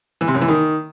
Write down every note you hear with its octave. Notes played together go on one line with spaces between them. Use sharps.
E3
C3
F#2
E3
D#3